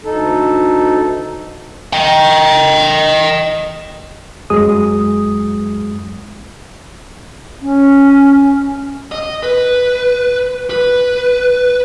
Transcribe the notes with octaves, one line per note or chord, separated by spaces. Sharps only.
D2 D#4 A4
D#5 G5
F#2 F#3 G#3 G#4 D#6
C#4
D#5
B4
B4